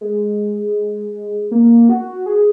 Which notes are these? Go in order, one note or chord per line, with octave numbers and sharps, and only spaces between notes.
G#3
A#3
F#4
G#4